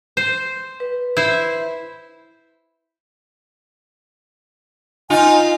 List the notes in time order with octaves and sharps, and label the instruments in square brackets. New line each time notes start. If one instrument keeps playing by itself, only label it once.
[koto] C5
[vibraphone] B4
[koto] E4 C5
[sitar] D#4 F4 [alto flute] G#5